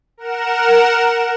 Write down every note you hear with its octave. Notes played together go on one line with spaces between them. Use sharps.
A#4 F#5 E7